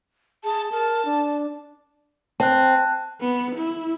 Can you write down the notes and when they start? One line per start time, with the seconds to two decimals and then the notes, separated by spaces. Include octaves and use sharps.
0.44 G#4 A5
0.72 A#4 A5
1.05 D4
2.40 C4 A5 F#6
3.20 B3
3.56 E4